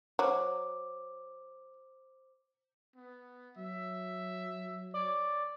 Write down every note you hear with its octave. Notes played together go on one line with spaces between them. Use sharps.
F#3 C5 D6
B3
F#3 E5
C#5 D5